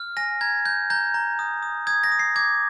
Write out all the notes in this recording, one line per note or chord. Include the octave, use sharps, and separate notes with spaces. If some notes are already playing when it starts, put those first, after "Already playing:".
Already playing: F6
G#5 A#6
A#5 G#6
G6
A#5 G6
A#5
D#6
D#6
D#6 G#6
A#6
D#6
C7
D6 G#6